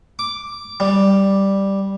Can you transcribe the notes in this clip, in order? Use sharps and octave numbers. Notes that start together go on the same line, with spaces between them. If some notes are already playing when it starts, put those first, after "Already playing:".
D6
G3